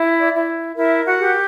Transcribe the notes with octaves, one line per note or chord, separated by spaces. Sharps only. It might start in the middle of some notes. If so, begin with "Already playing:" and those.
Already playing: E4
D5
E4
E4 A#4 E5
F#4 F#5
G4